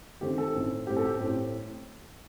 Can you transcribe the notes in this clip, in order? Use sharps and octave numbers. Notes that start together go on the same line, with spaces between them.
D#3 A3 C4 G4
A4
A2 A3 C4
A2 G3 C4 G4
A4
G4
A2 A3 C4